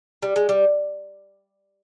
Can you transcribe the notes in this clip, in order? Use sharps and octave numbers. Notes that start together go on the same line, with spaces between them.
G3
G#3
G3